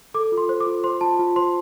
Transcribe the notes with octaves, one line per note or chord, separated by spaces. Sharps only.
A4 D6
F4
C6
C5
D6
F4
C5 C6
F4 A5
F4
C5 C6